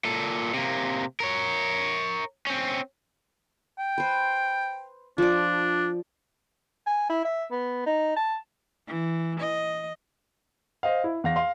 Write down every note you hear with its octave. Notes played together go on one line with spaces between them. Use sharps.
A#2 A4
C3 A#3
A#4 C#5
C4 C#4
G5
B4 C5
F3 D4 D5
G#5
E4
E5
B3
D#4
A5
E3
D#5
C5 D#5 F5
E4
E2 F5 A#6
F5 C6